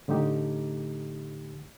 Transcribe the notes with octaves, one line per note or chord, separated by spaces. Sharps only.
A2 D3 A3 D#4 G4